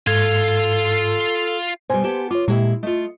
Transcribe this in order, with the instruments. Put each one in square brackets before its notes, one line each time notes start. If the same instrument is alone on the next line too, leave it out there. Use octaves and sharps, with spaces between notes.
[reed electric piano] G#2 G#6 [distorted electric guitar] F4 F5 [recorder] A4
[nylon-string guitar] B2 G3 [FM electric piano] C5 G#5
[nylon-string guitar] B3 G4 A5
[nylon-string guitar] F4 [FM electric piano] C#5 D6
[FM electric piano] A#2 G4 E5 [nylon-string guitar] G#3 E4
[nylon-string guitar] A3 F4 [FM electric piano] D#5